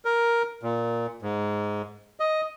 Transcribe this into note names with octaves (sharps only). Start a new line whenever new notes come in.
A#4
A#2
G#2
D#5